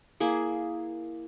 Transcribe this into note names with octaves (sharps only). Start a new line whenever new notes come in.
A#3 E4 G#4